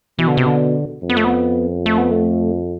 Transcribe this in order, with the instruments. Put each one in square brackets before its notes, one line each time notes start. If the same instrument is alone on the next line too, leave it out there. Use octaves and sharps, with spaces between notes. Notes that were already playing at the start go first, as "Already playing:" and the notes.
[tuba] B2 [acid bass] E3
[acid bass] D3
C3
D3
[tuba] F2
[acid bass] B3
A3
B3
A3
B3
A3